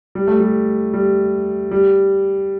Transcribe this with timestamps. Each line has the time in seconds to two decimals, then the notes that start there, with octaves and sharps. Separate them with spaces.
0.15 G3
0.28 A3
0.40 G3
0.93 G3
1.71 G3